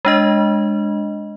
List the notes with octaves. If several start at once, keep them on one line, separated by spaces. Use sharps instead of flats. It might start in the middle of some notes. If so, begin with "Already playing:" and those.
G#3 D4 D#5